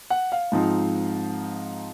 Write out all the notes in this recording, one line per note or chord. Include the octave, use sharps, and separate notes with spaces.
F#5
F5
G#2 F3 C4 D#4